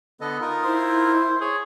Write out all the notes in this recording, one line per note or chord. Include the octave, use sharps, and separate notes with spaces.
D3 B3 A4 D#5
D#4 F4 A#4 D#6
E4 C5
G#4 C#5